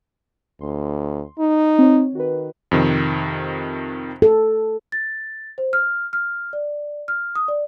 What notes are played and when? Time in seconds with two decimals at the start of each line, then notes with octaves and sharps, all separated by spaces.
0.61 D2 C6
1.39 D#4
1.79 C4 C#5
2.15 D#3 F#4 B4
2.71 F2 C3 D#3
4.22 A4
4.92 A6
5.58 C5
5.73 F6
6.13 F6
6.53 D5
7.08 F6
7.35 D#6
7.48 D5